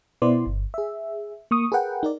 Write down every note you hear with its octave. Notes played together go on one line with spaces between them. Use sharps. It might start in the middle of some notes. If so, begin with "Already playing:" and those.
B2 B3 E4 C5 D5 C6
G1
G#4 E5
A#3 C#6 D#6
G#4 A#4 B4 F#5 G5
D#4 A#4 D5